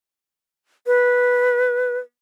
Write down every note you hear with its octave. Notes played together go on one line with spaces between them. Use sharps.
B4